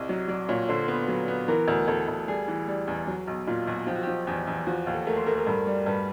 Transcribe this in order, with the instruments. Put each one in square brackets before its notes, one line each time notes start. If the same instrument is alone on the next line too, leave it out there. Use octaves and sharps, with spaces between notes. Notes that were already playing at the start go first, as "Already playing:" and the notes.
Already playing: [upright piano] C2 [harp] D#5
[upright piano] F#3
[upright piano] F#3 [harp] D5
[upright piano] A#2 [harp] C#5
[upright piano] D3 [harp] C5
[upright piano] B3 [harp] B4
[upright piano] F#3
B3
[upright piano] E3 [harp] A#4
[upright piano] D2
[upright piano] D2 [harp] A4
[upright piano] D2
[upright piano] G3 [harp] G#4
[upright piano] E3
G3
E2
F#3
B1
[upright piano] A#2 [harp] F4
[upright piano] B1 [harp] F#4
[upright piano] F3 [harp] G4
[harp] F#4
[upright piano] F3 [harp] G4
[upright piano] E2 [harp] G4
[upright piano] E2
[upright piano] F3 [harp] F#4
[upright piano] D#2
[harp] A4
[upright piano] A3 [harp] A#4
[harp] C5
[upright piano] A3 [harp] A#4
[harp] A#4
[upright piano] G2
G3
[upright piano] G2 [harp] B4